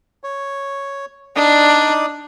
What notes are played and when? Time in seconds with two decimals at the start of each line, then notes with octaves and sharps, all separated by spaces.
0.24 C#5
1.36 D4 D#4 D5 D#6